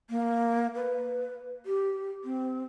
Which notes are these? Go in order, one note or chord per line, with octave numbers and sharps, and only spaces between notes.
A#3
B4
G4
C4